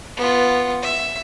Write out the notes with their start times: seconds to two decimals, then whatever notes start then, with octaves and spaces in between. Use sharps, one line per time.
0.17 B3 F4
0.82 E5